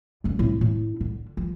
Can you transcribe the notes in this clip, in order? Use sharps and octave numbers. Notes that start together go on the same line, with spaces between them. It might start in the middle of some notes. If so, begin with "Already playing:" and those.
F#2 D3
A2 C4
A2
D3
F3